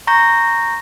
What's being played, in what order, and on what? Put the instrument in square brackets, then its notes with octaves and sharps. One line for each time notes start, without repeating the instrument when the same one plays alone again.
[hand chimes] A#5 C#6 G6 A#6